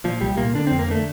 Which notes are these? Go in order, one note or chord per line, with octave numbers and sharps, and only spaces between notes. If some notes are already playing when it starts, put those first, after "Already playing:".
A#2 F3
C2 G3
A#2 A#3
D3 D4
F2 C4
A#3
D3 A3